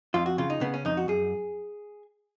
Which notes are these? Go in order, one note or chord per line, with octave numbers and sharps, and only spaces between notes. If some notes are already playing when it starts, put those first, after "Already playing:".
F2 F4
F#4
C#3 F4
D#4
C#3 B3
C#4
F2 D#4
F#4
F#2 G#4